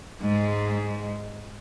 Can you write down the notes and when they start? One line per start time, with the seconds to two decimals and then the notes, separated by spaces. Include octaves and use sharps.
0.22 G#2 G#3